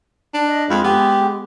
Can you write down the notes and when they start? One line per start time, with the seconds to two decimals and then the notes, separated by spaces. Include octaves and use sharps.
0.34 D4
0.47 D#5
0.70 F2 G#3 F5 B5
0.84 B3 G4